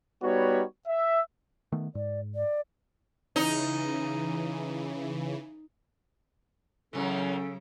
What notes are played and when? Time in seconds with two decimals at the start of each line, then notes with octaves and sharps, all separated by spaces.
0.23 G3 B3 D#4 F#4 C#5
0.88 E5
1.72 D#3 A3 B3
1.95 G#2 D5
2.35 D5
3.36 C#3 E3 D#4
6.93 F#2 C#3 E3 F#3 C#4 A4